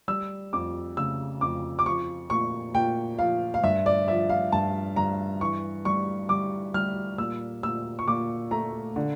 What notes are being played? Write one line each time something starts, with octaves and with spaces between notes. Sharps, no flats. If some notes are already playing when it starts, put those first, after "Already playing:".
G3 E6
F2 D6
C#3 E6
F2 D6
D6
F3 C#6
A#2 C#6
A#2 G5
F3 F5
F5
G2 E5
D5
F3 E5
F5
G2 A5
G2 A#5
E3 C#6
G3 C#6
G3 D6
G3 F6
A#2 E6
A#2 E6
C#6
A#2 D6
A3 A#5
D3